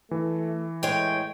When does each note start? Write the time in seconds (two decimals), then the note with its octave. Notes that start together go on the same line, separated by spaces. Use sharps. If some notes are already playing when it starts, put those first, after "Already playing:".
0.11 E3 A3
0.83 A2 G#3 C#5 G5